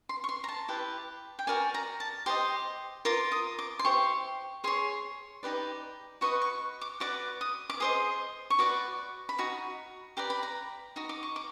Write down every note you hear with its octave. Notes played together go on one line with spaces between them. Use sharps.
C6
C#6
C6
A#5
A5
E4 G4 B4
G5
F#4 A#4 D5 G#5
A#5
A5
G4 C5 D#5 C6
F4 A#4 D6
D#6
D6
C6
E4 G4 C5 C#6
G#4 C#5 C6
D#4 G4 B4 D5
F#4 B4 D#5 C#6
C#6
D6
F#4 B4 D5 D6
D#6
D6
G#4 C5 D#5 D#6
C#6
F#4 B4 D5 D6
B5
D#4 F#4
G4 B4 D5 A#5
B5
A#5
D#4 F#4
D6
C#6
D6